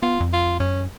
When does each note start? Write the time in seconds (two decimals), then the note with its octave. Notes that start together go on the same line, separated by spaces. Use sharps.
0.03 B3 F4
0.20 F2
0.33 F4
0.60 F#2 C#4